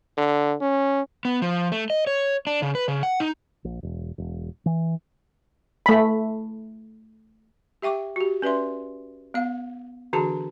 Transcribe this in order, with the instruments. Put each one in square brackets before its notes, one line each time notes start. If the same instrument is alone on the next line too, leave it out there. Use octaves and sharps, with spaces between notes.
[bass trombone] D3
C#4
[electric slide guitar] B3
F3
A3
D#5
C#5
D4
C#3
B4
C#3
F#5
D#4
[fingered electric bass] A#1
E1
E1
E3
[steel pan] A3 B5
[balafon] G4 E5 G5 C#6 D6
F#4 G4
C#4 B4 D5 E5 C6
B3 F5
D3 E3 D4 F#4 G#4 A5